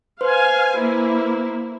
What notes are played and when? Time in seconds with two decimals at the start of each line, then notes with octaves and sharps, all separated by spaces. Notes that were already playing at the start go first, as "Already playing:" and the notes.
0.21 B4 C5 F5 G#5 C6
0.79 A#3 E4